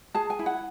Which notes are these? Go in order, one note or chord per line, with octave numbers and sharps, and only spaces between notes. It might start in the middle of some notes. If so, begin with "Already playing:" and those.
G#4 A5
G#5
E4
F#5